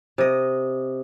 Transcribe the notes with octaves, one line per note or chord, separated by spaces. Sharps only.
C3 D#5